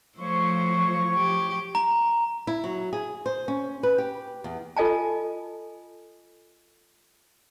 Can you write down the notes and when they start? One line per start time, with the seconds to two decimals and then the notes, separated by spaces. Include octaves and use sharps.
0.19 F3 A3 C5 C#5 C#6
1.15 G4
1.75 A#5
2.47 E4
2.64 F#3
2.93 G#4
3.26 C5
3.48 C#4
3.83 B4
3.98 G4
4.44 E2
4.77 F4 A4 D#5 G#5 A5